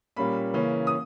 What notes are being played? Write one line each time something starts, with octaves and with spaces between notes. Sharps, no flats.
A#2 G3 A#3 C#4 B5
C#3 E3 A#3 C#4
D#6